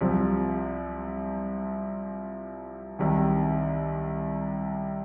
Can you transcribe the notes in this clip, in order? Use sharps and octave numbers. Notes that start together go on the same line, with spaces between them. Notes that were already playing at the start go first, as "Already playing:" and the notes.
C2 C3 F3
C2 C3 D#3